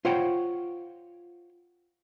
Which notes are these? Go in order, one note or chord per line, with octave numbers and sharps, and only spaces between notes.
F4 C5 C#5 F#5 G5